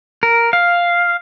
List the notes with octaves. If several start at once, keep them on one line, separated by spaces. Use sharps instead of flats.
A#4
F5